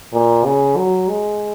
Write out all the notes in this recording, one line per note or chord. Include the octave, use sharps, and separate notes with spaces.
A#2
C#3
F#3
G#3